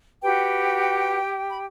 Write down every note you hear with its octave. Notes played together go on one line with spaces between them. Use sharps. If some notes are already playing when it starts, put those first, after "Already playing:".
F#4 G4 B4 G5
B5